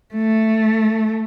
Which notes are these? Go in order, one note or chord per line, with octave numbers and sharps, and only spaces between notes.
A3